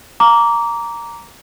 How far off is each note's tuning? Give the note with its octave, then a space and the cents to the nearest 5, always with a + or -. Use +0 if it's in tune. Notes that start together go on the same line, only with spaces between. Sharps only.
A#5 +0 D6 -20